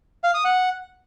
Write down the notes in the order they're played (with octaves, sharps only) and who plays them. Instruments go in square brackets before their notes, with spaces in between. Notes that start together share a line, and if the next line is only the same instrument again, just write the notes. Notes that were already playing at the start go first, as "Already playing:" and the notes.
[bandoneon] F5
D#6
F#5